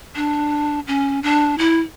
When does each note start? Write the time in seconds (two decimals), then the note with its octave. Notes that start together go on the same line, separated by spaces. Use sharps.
0.16 D4
0.87 C#4
1.23 D4
1.58 E4